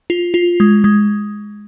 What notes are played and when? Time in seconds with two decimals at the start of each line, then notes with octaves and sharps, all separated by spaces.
0.10 F4
0.34 F4
0.60 G#3
0.84 G#3